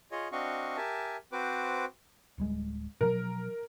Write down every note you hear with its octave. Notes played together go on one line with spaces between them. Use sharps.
F4 G#4 C#5 D#5
C4 D4 F#4 D#5 F5 C#6
G4 A#4 E5 G#5 A5
C4 F#4 B4 C5 D6
D1 G3 G#3
B2 F3 F#3 A#4